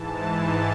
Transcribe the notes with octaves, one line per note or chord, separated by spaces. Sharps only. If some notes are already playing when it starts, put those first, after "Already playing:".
Already playing: G#2 E3 A5
A5